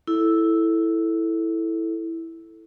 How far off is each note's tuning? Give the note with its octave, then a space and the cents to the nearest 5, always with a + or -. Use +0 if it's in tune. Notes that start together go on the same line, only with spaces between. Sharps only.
E4 -5 A4 +0